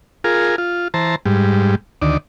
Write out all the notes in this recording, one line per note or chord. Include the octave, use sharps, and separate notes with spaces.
F4 G#4 A#4
F4
E3 C5 A5 A#5
G#2 G3
D2 D#3 D5